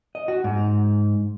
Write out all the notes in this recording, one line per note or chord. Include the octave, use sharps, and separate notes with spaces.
D#5
F#4
G#2